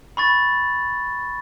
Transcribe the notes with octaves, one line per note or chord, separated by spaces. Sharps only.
B5 C#6 A6